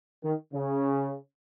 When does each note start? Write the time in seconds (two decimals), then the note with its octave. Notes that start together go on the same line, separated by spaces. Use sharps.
0.24 D#3
0.53 C#3